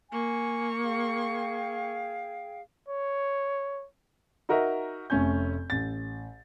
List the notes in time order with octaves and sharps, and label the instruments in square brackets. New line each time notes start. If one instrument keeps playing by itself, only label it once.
[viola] A#3 C#6 [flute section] G#5
[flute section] G#4 F5 G5
[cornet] C#5
[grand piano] D#4 F#4 A#4 D#5 E5
F1 A3 C#4 G#5 G6
A1 A6